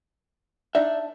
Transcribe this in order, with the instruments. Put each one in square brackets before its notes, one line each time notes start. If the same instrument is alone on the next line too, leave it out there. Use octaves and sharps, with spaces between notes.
[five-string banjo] D4 D#4 D5 [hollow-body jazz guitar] E5